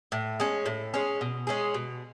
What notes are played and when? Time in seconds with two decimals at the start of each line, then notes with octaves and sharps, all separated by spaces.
0.12 A2
0.40 G#3 C#4
0.66 A2
0.94 G#3 C#4
1.21 B2
1.47 G#3 C#4 G#4
1.74 B2